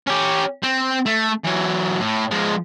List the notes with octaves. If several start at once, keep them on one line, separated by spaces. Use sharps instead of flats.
C#4 G4
C4
A3
E3 F#3
A2
F3 G#3